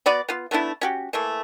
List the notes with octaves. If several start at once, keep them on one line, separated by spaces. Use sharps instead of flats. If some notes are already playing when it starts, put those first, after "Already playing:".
B3 F#4 D5 B5
B3 F4
A3 B3 D4 E4
C#4 F#4 G4
E3 A3 A#3